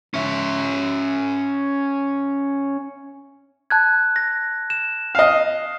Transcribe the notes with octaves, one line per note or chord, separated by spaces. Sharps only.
C#4 E5
A5 F#6 G#6
A#6
E7
D#5 F5